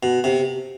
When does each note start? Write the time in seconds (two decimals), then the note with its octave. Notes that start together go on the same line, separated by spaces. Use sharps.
0.03 B2
0.24 C3